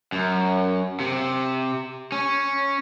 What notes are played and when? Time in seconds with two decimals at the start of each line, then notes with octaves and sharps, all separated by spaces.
0.12 F#2
1.00 C3
2.12 C#4